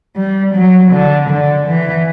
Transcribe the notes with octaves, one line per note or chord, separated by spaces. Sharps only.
G3
F#3
D3
D3
E3